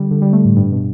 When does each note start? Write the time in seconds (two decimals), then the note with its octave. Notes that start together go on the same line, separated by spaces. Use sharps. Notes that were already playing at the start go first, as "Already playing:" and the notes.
Already playing: D3 G3
0.11 D3
0.22 G3
0.33 A3
0.45 A2
0.56 G2
0.72 B2